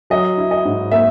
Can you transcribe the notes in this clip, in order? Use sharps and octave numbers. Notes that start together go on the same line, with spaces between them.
F#3 D#5
E4
D#5
G#2
A#3 E5